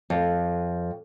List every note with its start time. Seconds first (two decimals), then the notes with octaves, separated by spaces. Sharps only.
0.10 F2